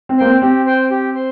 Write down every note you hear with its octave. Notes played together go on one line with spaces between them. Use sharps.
C4
A#3 C5 G5
C4
C4 G4
C5 G5
G4
C5